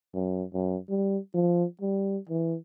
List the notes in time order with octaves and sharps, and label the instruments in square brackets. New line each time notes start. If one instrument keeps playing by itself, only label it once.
[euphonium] F#2
F#2
G3
F3
G3
E3